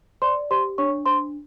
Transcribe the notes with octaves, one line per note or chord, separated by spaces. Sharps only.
C5 D5 C6
G4 C5 C6
D4 C#5 C#6
D4 C5 C6